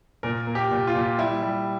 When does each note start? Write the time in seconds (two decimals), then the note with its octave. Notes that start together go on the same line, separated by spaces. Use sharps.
0.23 A#2 A#4
0.47 A#3
0.55 G4
0.71 A#2
0.87 F4
0.95 A#2
1.18 G3 E4
1.42 G3